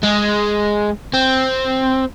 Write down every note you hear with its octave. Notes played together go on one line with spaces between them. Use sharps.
G#3
C4